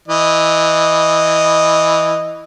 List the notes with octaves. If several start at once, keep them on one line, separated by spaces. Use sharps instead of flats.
E3 D#5